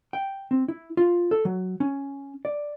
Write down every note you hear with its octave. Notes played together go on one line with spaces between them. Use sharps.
G5
C4
E4
F4
A4
F#3
C#4
D5